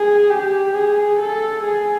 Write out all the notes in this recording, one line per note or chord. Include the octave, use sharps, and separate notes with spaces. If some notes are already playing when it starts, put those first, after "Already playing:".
Already playing: G#4
G4
G#4
A4
G#4